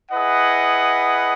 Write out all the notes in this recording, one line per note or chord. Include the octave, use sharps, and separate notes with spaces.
E4 G#4 B4 D#5 F#5